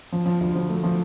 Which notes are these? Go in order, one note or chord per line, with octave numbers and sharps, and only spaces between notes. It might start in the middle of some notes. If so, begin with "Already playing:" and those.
F3
F3
D2
F3
A3
F3